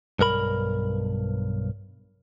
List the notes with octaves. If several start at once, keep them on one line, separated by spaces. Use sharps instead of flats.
B1 G2 A#4 B5